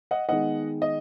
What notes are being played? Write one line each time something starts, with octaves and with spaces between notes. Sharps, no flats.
D#5 F#5
D#3 G#3 B3 D#4 D#5 F#5
D#5